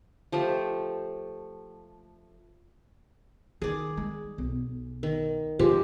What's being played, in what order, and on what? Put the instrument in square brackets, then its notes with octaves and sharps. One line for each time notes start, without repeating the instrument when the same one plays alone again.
[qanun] F3 A3 G4
[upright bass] D#3 [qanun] G#4 D5
[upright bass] G#3
B1
[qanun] D#3
[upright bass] G#2 [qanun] F3 G#3 G4